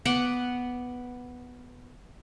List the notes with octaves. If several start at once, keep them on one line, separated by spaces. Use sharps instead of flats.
B3 B4 F#5 D6